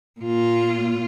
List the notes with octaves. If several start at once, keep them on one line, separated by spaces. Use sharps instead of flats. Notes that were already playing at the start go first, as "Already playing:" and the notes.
A#2 F4